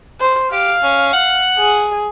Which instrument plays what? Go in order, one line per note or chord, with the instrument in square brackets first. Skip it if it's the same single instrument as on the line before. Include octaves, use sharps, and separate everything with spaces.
[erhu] C5
[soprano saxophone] G4 [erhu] F5
[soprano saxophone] C#4
F#5
[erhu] G#4